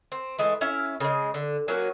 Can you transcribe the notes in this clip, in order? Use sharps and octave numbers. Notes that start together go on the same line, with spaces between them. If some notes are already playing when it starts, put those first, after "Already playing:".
C4
E3 G#3 A3
C#4 E4 F5
C#3 G#3
D3
F#3 A#3 C#4 F#4